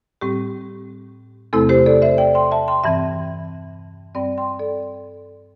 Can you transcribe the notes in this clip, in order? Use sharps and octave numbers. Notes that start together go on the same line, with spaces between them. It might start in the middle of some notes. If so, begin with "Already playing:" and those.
A2 G3 C4 G4
E2 C3 A3 C4 E4 A4
G4 C5
A4 D5
C5 E5
D5 G5
G5 C6
E5 A5
G5 C6
G2 E3 C4 E5 A5
G2 G3 C4 D5 G5
G5 C6
A4 D5